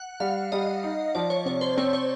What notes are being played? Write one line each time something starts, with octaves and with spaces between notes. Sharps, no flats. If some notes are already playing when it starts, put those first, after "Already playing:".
Already playing: F#5
G3 F5
G3 D#5
D#4
F3 D5
C#5
C3 C#5
C5
C4 C#5
C#5